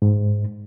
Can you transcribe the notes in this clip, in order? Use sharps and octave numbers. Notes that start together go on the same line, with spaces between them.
G#2